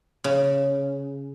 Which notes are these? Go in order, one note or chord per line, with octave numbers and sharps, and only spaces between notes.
C#3